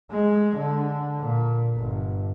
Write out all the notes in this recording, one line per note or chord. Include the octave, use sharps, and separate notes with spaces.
G#3
D3
A#2
G1